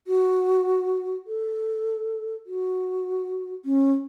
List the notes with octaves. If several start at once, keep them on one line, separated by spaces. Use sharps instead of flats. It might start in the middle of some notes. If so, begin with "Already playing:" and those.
F#4
A4
F#4
C#4